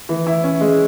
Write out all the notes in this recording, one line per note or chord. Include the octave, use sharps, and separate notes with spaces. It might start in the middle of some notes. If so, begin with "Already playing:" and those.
E3
E4
C#4
G#3